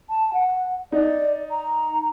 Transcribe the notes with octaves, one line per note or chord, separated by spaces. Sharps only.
A5
F#5
D#4 D5
A#5